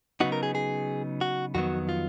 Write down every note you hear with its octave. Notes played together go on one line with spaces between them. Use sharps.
C#3 F#3 B3 D#4 F#4
A#4
G#4
G#4
F#4
F2 D#3 F#3 B3 F#4
F4